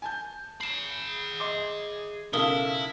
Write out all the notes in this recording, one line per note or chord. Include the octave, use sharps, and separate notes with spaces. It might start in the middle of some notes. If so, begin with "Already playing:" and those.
G#5 A5 G6
G#4 B5 C7 E7
D#5 C6 D6
B1 C#3 E4 A4 A#4 F5 D#6 G7